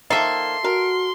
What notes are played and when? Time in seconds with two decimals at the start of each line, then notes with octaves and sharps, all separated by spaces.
0.10 D#3 F3 A#3 A4 E5 C6
0.64 F#4 A#4